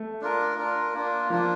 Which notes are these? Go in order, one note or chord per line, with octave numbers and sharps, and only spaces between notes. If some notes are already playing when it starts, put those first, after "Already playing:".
Already playing: A3
D4 F4 A#4
D4 F4 A#4
A#3 D4 F4
F3 A#3 D4 F4